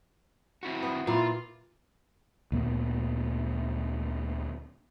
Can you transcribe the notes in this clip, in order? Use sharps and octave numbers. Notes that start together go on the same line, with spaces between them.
C4 E4 F#4
B3
A#2 E4 F4
D2 A#2 B3